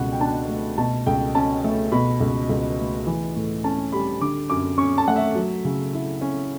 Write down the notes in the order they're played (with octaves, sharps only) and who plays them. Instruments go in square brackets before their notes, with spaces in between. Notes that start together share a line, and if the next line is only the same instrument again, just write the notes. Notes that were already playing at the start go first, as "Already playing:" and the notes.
Already playing: [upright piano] C#2 B2 F#5
G5
D4 A5
A3
B2 A5
C#2 G5
C#4 A5
A3
B2 B5
C#2
C#2
A3
E3
A2
C#4 A5
G3 B5
D3 D6
F#2 D6
C#4 C#6
A5
A3 F#5
E5
F#3
C#3
E4
C#4